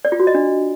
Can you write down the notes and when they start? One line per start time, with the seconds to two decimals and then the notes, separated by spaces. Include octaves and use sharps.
0.05 D5
0.12 F4
0.20 F#4
0.27 D#5
0.35 D4